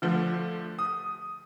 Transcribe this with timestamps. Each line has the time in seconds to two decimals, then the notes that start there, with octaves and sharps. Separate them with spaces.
0.02 D3 F3 A3
0.79 D#6